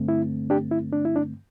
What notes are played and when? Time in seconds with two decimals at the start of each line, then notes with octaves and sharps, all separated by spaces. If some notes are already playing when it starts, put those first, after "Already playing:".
Already playing: G2 D3 A3 C4
0.08 E4
0.50 D4 G4
0.71 E4
0.93 D4
1.05 E4
1.16 D4